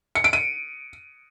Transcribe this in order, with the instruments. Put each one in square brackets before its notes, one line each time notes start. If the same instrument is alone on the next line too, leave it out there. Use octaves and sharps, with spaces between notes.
[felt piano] C#7
D7
D#7